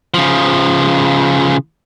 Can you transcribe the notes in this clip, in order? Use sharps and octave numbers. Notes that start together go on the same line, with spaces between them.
C#3 F3